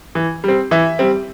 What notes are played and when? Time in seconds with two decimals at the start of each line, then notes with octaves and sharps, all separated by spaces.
0.15 E3
0.44 G3 C4
0.71 E3 E5
0.99 G3 C4